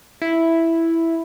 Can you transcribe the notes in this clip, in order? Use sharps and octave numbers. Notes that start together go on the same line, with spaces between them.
E4